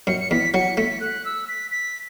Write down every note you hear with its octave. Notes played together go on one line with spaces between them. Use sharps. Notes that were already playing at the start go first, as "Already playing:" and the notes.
F#2 C#7
C#7
E2 B6
F#3 C#7
A3 B6
F#6
E6
B6
B6